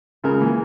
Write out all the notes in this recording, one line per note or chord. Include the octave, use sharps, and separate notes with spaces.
C#2 C#3 A#4
E3 A#3